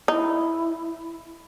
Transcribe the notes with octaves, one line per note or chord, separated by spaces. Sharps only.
D#4 E4